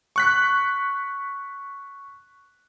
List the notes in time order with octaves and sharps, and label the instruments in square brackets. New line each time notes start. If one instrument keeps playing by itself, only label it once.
[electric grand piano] C#6 F#6 B6